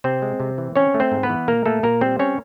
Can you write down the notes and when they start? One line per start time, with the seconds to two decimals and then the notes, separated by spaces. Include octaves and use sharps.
0.04 C3 C4 C5
0.22 G#3
0.40 C3
0.58 E3
0.76 C4 C#4 C#5
0.94 A3
1.00 C4 C5
1.12 G#2
1.23 B3 B4
1.30 E3
1.48 A#2 A#3 A#4
1.66 A3 A#3 A4
1.83 A#2 A#3 A#4
2.01 G3 C4 C5
2.19 C4 C#4 C#5